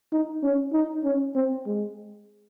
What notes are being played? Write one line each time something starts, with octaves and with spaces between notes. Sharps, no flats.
D#4
C#4
D#4
C#4
C4
G#3